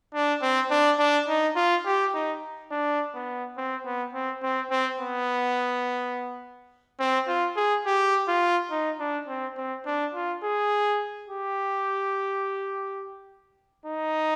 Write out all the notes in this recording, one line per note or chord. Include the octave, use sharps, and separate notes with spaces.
D4
C4
D4
D4
D#4
F4
G4
D#4
D4
B3
C4
B3
C4
C4
C4
B3
C4
F4
G#4
G4
F4
D#4
D4
C4
C4
D4
F4
G#4
G4
D#4